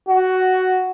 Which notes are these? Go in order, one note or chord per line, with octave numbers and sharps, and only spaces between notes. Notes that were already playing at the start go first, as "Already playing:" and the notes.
F#4